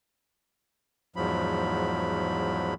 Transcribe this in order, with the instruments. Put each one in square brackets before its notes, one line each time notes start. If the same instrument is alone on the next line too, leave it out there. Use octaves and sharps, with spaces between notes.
[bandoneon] E2 G#2 F3 F#3 B5